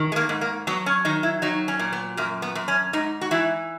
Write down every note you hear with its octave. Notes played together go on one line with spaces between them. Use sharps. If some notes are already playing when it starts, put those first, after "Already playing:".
Already playing: D#3
G#3
A#3
G#2
A#3
F#3 B3
C#4
D#3 D#4
E4
F#3 D#4
C#4
A#2
B3
F#2 A#3
B3
F#2
C#4
G#2 D#4
F#4
E3 E4